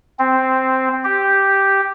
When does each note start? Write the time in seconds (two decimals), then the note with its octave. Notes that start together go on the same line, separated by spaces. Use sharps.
0.19 C4
1.04 G4